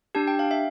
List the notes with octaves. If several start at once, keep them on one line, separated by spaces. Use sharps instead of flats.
D4 G4 A5
G5
F5
E5